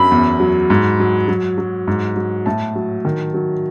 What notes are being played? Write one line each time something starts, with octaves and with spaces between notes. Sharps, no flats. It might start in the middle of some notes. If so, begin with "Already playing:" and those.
Already playing: F#2 B5
E2
F#3
G#2
F#3
F#3
F#3
G#2
F#3
A2 A5
F#3
D#3
F#3